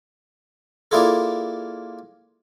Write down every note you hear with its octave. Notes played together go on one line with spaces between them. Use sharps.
A#3 D4 E4 F4 G#4 A4